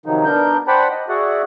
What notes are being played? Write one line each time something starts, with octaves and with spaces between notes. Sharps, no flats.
C3 D#3 F3 F#3 D#4
B3 D4 A#4 G6
C5 D5 F#5 G5 A5 B5
D#5
F#4 G#4 D5 E5 F#5